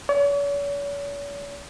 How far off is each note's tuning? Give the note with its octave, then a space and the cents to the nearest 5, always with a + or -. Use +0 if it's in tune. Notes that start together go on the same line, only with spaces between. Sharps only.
C#5 +45